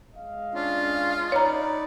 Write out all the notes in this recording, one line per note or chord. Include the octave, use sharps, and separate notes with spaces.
G#3 D#5 F5
C#4 D4 F4
D#4 B4 C#5 D5 A#5